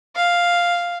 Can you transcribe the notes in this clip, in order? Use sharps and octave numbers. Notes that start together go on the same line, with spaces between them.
F5